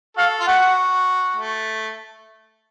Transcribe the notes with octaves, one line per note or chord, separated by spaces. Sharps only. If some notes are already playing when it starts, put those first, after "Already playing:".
F#4 A4 F5
F4
A3 F#4 F#5
A3